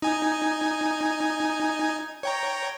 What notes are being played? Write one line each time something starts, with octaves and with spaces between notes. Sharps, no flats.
D#4 G#5
C#5 G5 A#5